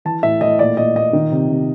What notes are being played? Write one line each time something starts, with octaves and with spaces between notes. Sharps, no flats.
E3 A5
A2 E5
A2 D#5
A#2 D5
A#2 D#5
A#2 D#5
D#3
C3
C3